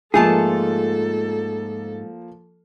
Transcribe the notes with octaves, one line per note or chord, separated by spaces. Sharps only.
G#2 F3 A3 A#3 F4 G#4 A4 A5